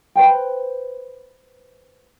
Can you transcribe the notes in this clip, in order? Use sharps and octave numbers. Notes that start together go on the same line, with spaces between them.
B4 C5 G5